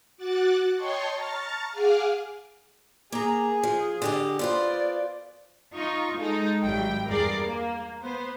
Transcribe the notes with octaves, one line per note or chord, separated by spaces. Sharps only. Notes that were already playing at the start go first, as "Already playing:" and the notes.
F#4 D6 F#6 A6
C#5 D#5 G5 A5 C6 C#6
A5 A#5 C#6 F6 A6
G#4 F5 F#5 G#5 D6 F6
A#3 G#4 A#5
F3
D3 G4 D#5
B3 F4 C5 D5
D#4 F4 C#6
G#3 D#4 A4
G#1 F#3 G3 G5
E2 G2 G#4 A#4 D5 C7
A#3
B3 C5